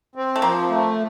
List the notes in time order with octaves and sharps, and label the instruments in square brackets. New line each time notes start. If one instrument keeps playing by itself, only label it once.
[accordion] C4
[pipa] A3
[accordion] F3 [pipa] A#3
[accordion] A3